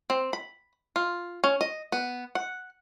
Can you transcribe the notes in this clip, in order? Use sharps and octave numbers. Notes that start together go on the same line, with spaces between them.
C4
B5
F4
C#4
D#5
B3
F#5